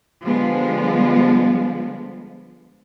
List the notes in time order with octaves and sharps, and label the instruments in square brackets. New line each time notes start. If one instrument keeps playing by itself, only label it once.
[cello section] D3 F3 G3 G#3 B3